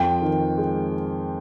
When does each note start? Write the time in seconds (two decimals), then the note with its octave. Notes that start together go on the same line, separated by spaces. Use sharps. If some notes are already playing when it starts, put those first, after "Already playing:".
Already playing: F2 G5
0.22 D#3
0.58 G#3